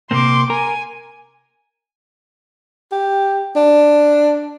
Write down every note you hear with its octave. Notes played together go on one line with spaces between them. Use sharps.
C3 A#3 C4 C6 D6
A#4 G#5
G4
D4